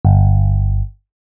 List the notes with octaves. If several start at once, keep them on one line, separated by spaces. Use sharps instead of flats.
G1